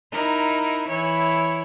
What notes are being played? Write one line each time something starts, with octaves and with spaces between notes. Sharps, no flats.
D#4 E4 A#4
E3 E4 C#5